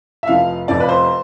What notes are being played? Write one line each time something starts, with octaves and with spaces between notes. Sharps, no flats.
E5
F1 F2 C3 F3 F5
F1 F2 C3 F3 D5
B4
C5